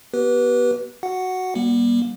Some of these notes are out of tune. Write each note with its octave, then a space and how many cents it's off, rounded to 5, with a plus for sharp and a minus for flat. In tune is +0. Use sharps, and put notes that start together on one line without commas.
B3 -15 G4 -30 B4 -20
F#4 +0 F#5 +0
G3 +0 A#3 +40